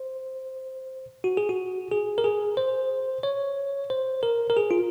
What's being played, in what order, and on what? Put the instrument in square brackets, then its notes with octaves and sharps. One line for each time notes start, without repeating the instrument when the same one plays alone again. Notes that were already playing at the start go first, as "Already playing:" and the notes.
Already playing: [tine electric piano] C5
F#4
G#4
F#4
G#4
A#4
G#4
C5
C#5
C5
A#4
A#4
G#4
F4